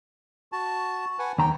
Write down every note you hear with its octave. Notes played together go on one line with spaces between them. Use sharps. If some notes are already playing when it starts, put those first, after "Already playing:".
F#4 A5
B4 F#5 G#5
D#2 G5 A#5